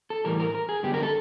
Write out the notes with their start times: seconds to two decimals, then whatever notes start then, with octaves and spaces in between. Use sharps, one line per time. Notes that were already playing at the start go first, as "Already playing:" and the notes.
0.10 A4
0.25 A2 E3 G3 A#4
0.40 A#4
0.55 A#4
0.69 G#4
0.83 G2 D3 F#3 B3 G4
0.94 A#4
1.03 A4